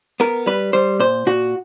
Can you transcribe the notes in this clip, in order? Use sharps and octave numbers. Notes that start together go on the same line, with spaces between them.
B3 A#4
G3 B4
G3 C5
A#2 C5
A#2 F#4